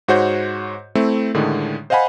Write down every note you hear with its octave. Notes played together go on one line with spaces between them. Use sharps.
G#2 F#4 C5 C#5 F#5 G6
A3 C4 E4
A2 D3 D#3 G#3
C5 D#5 F5 F#5 G#5 B5